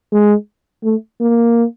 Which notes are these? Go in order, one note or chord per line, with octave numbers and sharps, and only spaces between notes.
G#3
A3
A#3